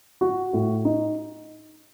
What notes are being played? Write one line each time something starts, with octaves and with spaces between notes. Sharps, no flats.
F#4
A2
D#4